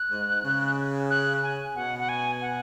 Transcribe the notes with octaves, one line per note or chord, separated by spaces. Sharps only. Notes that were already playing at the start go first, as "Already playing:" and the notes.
Already playing: F#6
G#2
C#3
F#6
G#5
B2 F#5
F#5
G#5
F#5